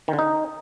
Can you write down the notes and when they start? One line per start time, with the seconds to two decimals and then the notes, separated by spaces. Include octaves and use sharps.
0.08 D#3
0.13 D3
0.19 D#4